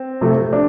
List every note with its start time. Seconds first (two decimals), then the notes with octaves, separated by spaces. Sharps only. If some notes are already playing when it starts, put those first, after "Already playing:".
Already playing: C4
0.21 C3 F3 A3
0.53 D4